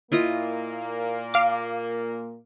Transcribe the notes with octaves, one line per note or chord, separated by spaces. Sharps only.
A#2 A#3 E4 F4 D#5
F5 D6